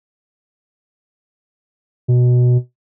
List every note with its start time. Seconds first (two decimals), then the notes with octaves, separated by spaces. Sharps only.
2.08 B2